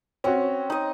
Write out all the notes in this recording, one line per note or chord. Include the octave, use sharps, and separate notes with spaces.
C4 C#4 F#4 C#5
D#4 D#5